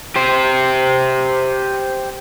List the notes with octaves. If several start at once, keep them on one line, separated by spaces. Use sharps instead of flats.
G4 C5